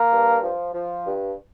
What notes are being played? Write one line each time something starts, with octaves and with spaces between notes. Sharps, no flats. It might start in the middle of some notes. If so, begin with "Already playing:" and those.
Already playing: A#3 A#4
G2
F3
F3
G2